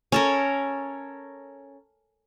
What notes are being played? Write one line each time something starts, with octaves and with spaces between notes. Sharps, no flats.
C#4 A4 A#4